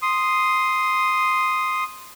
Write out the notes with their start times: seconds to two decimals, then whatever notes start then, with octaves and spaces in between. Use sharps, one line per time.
0.02 C6 D#6